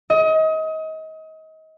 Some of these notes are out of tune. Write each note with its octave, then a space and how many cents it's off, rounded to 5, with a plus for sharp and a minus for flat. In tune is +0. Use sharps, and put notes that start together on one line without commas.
D#5 +30